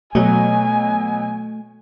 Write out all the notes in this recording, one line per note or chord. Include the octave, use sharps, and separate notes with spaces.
B2 F#3 A3 G#5